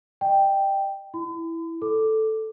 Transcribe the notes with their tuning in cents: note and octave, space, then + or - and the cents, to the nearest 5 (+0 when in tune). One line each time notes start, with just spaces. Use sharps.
D#5 -35 G5 +0
E4 +0 B5 +45
A4 +0 D6 +5